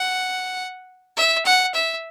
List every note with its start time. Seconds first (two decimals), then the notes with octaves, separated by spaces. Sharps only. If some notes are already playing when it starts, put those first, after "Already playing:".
Already playing: F#5
1.17 E5
1.45 F#5
1.74 E5